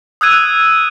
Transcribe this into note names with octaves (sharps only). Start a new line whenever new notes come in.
D#6 E6 F#6 G#6 D#7